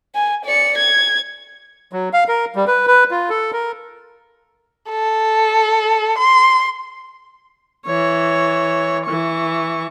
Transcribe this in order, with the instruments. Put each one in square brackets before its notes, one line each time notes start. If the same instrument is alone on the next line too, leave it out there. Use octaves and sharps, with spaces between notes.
[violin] G#5
D5 C#7
G#6
[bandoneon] F#3
F5
A#4
G3
B4
B4
F4
A4
A#4
[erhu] A4
C6
[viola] E3 C#5
E3 C#6